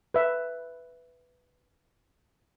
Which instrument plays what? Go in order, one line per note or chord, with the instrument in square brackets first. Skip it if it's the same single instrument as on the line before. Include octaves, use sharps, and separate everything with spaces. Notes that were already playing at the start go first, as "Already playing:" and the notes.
[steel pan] B4 E5